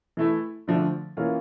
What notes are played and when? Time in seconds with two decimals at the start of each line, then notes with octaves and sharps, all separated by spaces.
0.17 E3 A3 E4
0.67 D3 F3 A3 D4
1.17 E3 A#3 C#4 F4